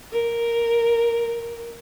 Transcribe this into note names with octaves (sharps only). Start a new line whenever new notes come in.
A#4